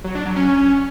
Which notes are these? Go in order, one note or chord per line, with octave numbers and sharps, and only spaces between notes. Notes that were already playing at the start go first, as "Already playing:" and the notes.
F#3
D4
F#3
C#4